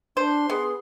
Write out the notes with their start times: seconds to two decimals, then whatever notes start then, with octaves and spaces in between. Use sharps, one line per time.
0.17 D4 C5 C6
0.50 B3 G#4